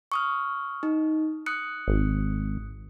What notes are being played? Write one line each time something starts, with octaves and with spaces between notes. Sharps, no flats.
C#6 D#6 F6
D#4
D#6 F#6 C#7
G#1